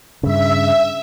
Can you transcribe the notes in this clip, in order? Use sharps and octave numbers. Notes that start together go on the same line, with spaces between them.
G2 C#3 E5